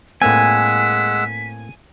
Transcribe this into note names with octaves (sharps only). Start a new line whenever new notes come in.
A2 G#3 A#3 C4 F#5 G#5 E6 B6